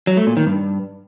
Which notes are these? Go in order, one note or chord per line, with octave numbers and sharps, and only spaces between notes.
F#3
A3
A#2
D#3
G2